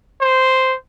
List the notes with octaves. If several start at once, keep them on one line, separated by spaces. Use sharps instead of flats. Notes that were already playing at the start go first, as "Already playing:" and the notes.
C5